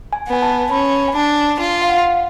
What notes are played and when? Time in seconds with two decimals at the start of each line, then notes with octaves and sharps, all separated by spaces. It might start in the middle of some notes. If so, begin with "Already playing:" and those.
0.13 G#5
0.28 B3
0.33 G#5
0.42 A5
0.71 C#4 B5
1.08 G#5
1.15 D4 A5
1.59 F4 G#5
1.82 F5
1.89 F#5